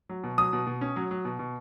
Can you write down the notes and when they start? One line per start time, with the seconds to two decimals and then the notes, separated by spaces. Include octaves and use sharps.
0.09 F#3
0.24 B2
0.38 F#3 D#6
0.53 B2
0.67 B2
0.81 C#4
0.96 F#3
1.11 F#3
1.25 B2
1.39 B2